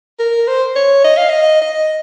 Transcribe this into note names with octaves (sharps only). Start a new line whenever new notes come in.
A#4
C5
C#5
D#5
F5
D#5
D#5